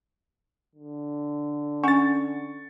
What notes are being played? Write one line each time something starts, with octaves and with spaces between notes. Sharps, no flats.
D3
C#4 F#5 G#5 C#6 A6